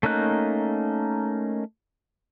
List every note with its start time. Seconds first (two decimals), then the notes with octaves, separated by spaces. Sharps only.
0.03 A3 A#3 C#4 D#4 F#6